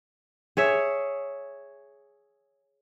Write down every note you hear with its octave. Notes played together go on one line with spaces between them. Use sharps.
G#4 C#5 E5